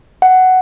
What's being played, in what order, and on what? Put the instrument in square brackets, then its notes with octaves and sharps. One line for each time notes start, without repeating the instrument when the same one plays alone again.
[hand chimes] F#5